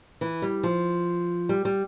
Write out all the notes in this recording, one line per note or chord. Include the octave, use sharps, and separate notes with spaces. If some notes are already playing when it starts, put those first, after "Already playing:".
E3
G3
F3
G3
G3